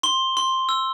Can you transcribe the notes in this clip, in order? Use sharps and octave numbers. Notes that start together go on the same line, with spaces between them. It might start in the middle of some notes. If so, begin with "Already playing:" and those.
C6 G7
C6
E6